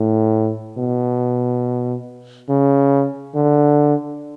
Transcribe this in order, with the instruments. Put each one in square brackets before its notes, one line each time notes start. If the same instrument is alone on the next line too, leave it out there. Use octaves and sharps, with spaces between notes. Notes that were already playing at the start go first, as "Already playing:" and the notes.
Already playing: [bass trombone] A2
B2
C#3
D3